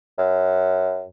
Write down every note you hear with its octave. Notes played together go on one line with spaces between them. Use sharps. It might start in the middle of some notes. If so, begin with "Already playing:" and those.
F#2